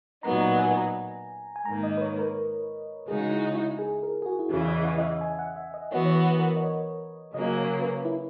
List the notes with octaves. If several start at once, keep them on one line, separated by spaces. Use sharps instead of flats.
A#2 F#3 B3 D#4 A#5
A#5
G#5
A#5
G#5
G#2 D#3 A#3 A#5
D#5
B4
C#5
A#4
C#3 G#3 D#4 F#4 G#4
E4
E4
G#4
A#4
G#4
F#4
E4
E2 C#3 E3 F#4
E5
D#5
F#5
D#5
E5
G#5
F#5
E5
D#5
E3 B3 F#4 C#5
C#5
B4
A#4
D#5
C#5
C#3 F#3 A#3 D#5
C#5
B4
E4